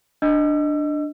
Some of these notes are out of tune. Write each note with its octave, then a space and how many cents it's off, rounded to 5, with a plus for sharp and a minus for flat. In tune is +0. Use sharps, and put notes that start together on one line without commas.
D4 +5 D#5 +0 E6 +30